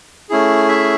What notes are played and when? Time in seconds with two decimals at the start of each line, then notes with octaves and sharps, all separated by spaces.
0.29 A3 C#4 E4 G#4
0.68 E5